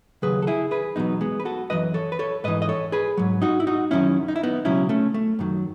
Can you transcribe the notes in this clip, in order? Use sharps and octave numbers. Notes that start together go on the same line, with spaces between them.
D#2 C#3 F#3 G#4 B4
A4
E4 G#4
G#4 B4
E2 B2 F#3 B3 D#4
G#3 B3
B4
F#4 A4
F#2 E3 B4 D#5
A4 C#5
B4
A4 C#5
G#2 E3 B4 D#5
D#5
A4 C#5
G#4 B4
G#2 F#3
D#4 F#4
E4
D#4 F#4
F#2 D#3 F#3 C#4 E4
D#4
E4
B3 D#4
C#2 B2 F#3 C#4 E4
A3 C#4
A3
F#2 D#3 F#3